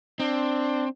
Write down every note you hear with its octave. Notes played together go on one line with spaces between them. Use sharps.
C4 D4